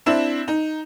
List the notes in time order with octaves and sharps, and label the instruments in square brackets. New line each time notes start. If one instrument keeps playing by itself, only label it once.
[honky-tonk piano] C4 D4 E4 E5 E7
D#4